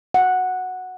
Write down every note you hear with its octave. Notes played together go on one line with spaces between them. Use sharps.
F#5